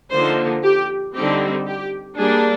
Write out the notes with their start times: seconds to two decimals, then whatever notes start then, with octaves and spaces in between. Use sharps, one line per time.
0.11 D3 F3 A#3 D#4 C5
0.63 G4
1.15 D3 G3 C4 D#4 G4
1.66 G4
2.17 G3 A#3 D4 G#4